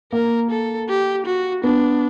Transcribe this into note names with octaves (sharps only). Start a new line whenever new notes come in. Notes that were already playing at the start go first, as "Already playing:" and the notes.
A#3 A#4
A4
G4
F#4
B3 D4